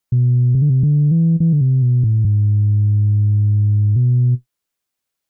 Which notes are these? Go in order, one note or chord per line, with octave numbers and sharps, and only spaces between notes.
B2
C3
D3
C3
D3
E3
E3
D3
C3
B2
A2
G#2
B2